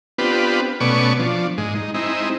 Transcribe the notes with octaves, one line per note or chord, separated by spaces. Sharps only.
B3 C4 D4 F4 G4 B4
B2 A3 B3 C#4 D5 C#6
F3 D4
G#2 G#3
D#4
G#3 C4 D#4 E4